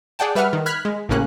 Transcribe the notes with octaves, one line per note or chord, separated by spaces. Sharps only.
G#4 D5 F#5 G5 A5
G3 B4 E5 F#5 F6
D#3
B5 F6 F#6 G#6 B6
G#3
A1 A2 C#3 A#3 C#4 F#6